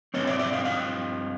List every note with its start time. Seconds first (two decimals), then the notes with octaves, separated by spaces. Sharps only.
0.14 G2 D#3 G3 C4 C#5 D#5
0.27 D5 E5
0.39 D5 E5
0.53 D#5 F5
0.65 D#5 F5